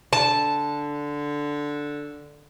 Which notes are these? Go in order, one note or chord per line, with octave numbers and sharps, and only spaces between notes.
D3 A5